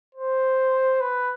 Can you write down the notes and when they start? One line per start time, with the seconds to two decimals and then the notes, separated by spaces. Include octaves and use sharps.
0.15 C5
1.01 B4